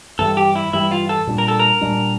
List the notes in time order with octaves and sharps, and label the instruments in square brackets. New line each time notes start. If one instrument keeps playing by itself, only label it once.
[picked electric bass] G2 E3 G3 [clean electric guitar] A4
[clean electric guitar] G4
E4
[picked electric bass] G2 E3 G3 [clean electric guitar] E4
[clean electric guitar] F4
A4
[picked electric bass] A#2 G3 D4
[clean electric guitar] A#4
A4
A#4
[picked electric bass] A#2 G3 D4